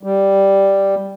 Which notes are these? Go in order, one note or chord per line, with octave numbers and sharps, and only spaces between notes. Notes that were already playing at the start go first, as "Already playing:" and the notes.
G3